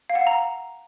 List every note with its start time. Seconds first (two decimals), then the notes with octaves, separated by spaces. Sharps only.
0.10 F5
0.15 F#5
0.21 F5
0.27 A#5